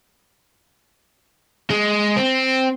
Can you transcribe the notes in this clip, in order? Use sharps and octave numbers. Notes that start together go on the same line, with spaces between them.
G#3
C4